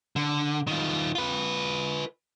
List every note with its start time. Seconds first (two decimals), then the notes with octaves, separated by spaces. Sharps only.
0.16 D3
0.67 D#3 F4
1.15 F4 B4